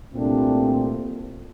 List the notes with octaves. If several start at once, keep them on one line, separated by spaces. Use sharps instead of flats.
C2 A#2 A3 C4 D4